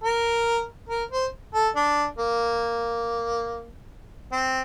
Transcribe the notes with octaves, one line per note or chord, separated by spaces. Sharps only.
A#4
A#4
C5
A4
D4
A#3
C4